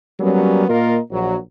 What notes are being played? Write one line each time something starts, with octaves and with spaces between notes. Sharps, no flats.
F#3 G3 A#3 B3 C#4
A#2 A#3 F4 A#4 D#5
A#1 F#3